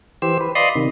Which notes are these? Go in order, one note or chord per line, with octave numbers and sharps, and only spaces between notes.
E3 G4 C5 E6
B4
D5 D#5 F5 B5 C6 D#6
C3 D#3